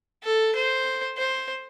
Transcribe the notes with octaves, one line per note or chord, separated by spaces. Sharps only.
A4
C5
C5